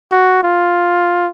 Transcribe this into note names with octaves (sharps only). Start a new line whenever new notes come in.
F#4
F4